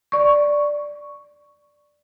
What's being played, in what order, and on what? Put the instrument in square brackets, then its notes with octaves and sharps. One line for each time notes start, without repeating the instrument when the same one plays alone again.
[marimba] D5 C#6